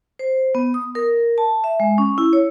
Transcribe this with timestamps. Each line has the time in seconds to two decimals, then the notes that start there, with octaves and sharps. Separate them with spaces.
0.19 C5
0.55 B3
0.74 D#6
0.95 A#4
1.38 A5
1.64 E5
1.80 G#3
1.98 C#4
2.18 E4
2.33 C#5